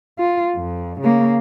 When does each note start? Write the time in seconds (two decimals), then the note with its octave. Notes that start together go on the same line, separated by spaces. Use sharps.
0.19 F4
0.56 F2
1.01 C#3 A#3